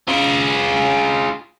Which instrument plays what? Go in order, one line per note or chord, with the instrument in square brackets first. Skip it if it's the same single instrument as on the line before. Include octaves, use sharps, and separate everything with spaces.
[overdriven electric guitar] F4 G#4